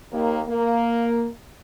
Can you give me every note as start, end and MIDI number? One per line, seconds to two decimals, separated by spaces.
0.12 0.41 39
0.12 0.41 58
0.47 1.28 58